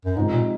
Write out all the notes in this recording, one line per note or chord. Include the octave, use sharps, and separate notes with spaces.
F#2
G#2 C3 F3 G#3 D#4
A#2